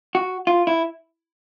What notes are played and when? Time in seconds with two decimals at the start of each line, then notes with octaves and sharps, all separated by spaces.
0.15 F#4
0.47 F4
0.67 E4